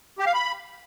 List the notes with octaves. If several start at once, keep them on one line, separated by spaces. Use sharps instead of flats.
G4
F5
B5